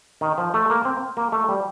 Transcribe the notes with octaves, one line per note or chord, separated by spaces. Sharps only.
D#3
F3
A3
A#3
C4
A#3
A3
G3